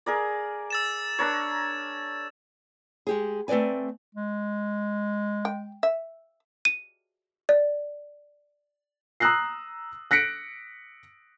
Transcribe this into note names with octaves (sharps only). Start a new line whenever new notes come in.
G#4 A#4 D5
E6 A6 E7
D4 A#4 C#5
G#3 G4 G#4
A3 C4 B4 D5 G#5
G#3
G5
E5
D#7
D5
A#5 D#6 E6 F#6 A#6 C7
F#6 A#6 B6 C#7 D7